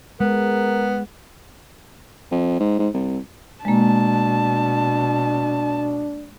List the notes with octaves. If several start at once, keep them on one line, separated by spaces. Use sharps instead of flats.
G#3 B3 A#4
F2
G#2
G#2
C2
B2 G#3 A#3 D4 A5